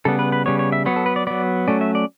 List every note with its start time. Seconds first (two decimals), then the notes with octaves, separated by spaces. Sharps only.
0.05 C#3 G3 B3 A4
0.19 B4
0.32 B4
0.46 C#3 G3 B3 C#5
0.59 C#5
0.72 E5
0.86 F#3 B3 C#5
0.96 A4
1.06 B4
1.16 D5
1.27 F#3 B3 D5
1.68 F#3 A3 C#4 D5
1.81 E5
1.95 D5